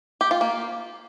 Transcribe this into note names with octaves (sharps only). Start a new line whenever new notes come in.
G4
F4
A#3